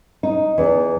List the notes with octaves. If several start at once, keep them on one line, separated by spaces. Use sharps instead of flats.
D#4
E2